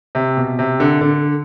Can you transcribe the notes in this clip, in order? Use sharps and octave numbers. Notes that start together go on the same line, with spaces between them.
C3
B2
C3
D3
D3